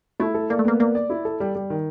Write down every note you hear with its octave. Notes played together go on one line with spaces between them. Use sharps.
A3 E4
A4
A#3 D5
A3
A#3 B3
A#3 D5
D5
E4
A4
G3
G3
D#3